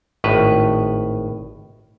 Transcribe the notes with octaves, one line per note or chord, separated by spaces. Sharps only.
G#1 A2 B4